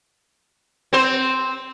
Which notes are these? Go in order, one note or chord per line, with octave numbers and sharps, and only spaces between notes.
C4 C5